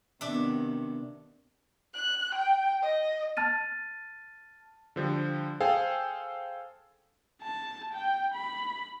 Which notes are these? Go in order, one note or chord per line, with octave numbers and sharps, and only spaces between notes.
C3 D#3 B3 D4 E5
F#6
G5
D#5
A5 F6 A6 D#7
D3 F3 G3
G#4 A4 C5 F5 G5 G#5
A5
G5
B5